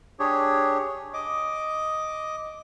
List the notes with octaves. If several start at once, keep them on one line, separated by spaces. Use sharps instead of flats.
D4 G4 G#4 C#5
D#5 D6